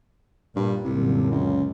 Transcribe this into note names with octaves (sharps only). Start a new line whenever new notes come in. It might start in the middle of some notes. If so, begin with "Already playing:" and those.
G2 A#2
C2 F#2 A#2 D3
C#2